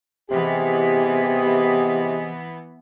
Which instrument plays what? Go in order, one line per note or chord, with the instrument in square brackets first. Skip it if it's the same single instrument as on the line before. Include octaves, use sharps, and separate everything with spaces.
[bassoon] C3 [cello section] E3 B3 [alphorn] G4 [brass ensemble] G#4 D#5